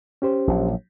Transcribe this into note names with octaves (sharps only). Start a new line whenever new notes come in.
C#4 G4 C5
A#1 A#2 F#3